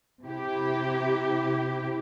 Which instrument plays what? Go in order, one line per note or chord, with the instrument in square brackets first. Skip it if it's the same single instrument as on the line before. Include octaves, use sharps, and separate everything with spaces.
[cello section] C3 E4 G4